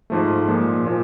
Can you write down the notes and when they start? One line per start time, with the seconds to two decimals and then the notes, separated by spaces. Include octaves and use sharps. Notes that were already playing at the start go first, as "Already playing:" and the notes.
0.10 G#2 F3 A3
0.48 A#2 F3 G#3
0.86 A#2 F3